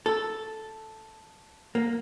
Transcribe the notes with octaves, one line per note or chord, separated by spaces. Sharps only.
A4
A#3